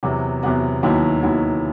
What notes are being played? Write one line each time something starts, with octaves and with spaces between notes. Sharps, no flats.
E2 C3 F#3 B3 F#4
E2 C3 F#3 B3 F#4
D#2 D#3 F#3 B3 E4
D#2 D#3 F#3 B3 E4